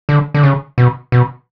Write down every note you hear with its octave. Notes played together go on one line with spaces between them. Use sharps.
D3
D3
C#3
B2
B2